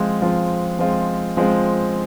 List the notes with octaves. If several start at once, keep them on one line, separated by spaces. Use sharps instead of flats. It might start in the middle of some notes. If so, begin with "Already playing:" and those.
Already playing: F3 G#3 C4 F4
F3 G#3 C4 F4
F3 G#3 C4 F4
F3 G#3 C4 F4